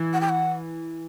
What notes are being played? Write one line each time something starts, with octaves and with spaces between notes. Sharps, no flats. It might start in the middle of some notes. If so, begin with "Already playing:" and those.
Already playing: E3
F#5
G5
F#5